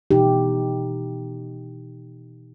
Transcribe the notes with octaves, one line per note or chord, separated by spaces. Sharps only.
B2 E3 D#4 G4